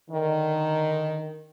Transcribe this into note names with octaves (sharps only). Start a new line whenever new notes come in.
D3 D#3